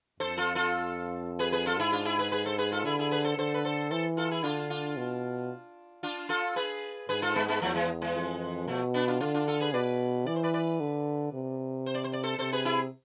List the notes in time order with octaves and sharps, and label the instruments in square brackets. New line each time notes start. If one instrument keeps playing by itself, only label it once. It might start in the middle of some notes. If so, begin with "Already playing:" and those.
[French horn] F2 [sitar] A4 C5
[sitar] F4 A4
F4 A4
G#4 B4
G#4 B4
F4 A4
[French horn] G#2 [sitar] E4 G#4
[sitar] D4 F4
E4 G#4
G#4 B4
G#4 B4
A4 C5
G#4 B4
F4 A4
[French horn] D3 [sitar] E4 G#4
[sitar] E4 G#4
G#4 B4
A4 C5
[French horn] D3 [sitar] A4 C5
[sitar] B4
A4 C5
[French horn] E3 [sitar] A4 C5
[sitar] F4 A4
E4 G#4
[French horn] D3 [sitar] D4 F4
[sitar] D4 F4
[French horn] B2
[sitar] D4 F4
F4 A4
G#4 B4
[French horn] G#2 [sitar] G#4 B4
[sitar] F4 A4
G#3 B3
G#3 B3
[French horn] E2 [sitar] F3 A3
[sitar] E3 G#3
E3 G#3
[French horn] F2
[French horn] B2 [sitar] F3 A3
[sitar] B3 D4
D4 F4
[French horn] D3 [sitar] D4 F4
[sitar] D4 F4
F4 A4
G#4 B4
[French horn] B2 [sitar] B4 D5
[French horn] E3 [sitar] D5
[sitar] C5
B4 D5
B4 D5
[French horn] D3
C3
[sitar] C5
D5
C5
D5
A4 C5
[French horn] C3 [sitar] A4 C5
[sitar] G#4 B4
E4 G#4